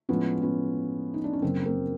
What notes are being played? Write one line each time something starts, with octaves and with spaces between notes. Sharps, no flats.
A2 F3 G#3 B3 C#4
B3 C#4
D#4
D4
C#4
F#2 C#3 F#3 A#3 C4
A#3 C4